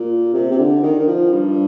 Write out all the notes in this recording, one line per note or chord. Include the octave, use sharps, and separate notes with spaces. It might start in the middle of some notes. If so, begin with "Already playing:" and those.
Already playing: A#2
C3
C3
D3
D#3
D#3
F3
G2